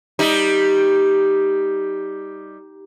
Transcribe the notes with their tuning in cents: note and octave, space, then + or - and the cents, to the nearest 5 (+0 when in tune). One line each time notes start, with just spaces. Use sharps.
G3 +0 D#4 +10